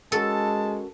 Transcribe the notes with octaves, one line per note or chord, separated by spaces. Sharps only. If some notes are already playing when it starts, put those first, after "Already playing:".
G#3 C#4 F#4 A4 A#4 A5